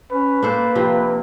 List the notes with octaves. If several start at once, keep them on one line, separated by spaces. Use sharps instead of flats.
C#4 B4
A#3 D4 A4 C5
C3 F3 C4